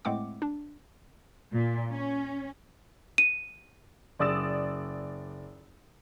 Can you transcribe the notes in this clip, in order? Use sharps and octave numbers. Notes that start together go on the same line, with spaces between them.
A2 G#3 A3 C4 F#5 D6
D4
A#2
C#4
D#7
F#1 D5 D#6 E6 A6 E7